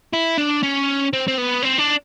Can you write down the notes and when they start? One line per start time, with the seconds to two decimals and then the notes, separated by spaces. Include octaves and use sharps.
0.14 E4
0.38 D4
0.63 C#4
1.13 C4
1.28 C4
1.38 B3
1.62 C4
1.78 D4